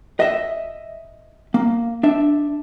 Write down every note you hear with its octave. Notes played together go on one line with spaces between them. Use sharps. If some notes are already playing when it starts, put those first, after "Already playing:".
D#5 E5
A#3
D4 E5